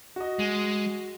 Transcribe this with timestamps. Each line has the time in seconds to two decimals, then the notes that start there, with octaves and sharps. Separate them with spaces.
0.16 F#4 D#5
0.40 G#3